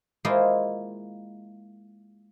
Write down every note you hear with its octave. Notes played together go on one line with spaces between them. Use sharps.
G#3 A#3 E4 F4 C5 D#5